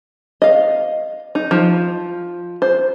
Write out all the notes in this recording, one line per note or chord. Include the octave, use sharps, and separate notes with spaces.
D#5 F5
D#4
F3
C5